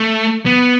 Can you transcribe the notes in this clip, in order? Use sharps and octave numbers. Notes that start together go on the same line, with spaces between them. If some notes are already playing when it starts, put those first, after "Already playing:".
Already playing: A3
B3